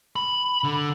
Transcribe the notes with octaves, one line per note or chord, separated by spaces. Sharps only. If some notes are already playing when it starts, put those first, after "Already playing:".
B5
D3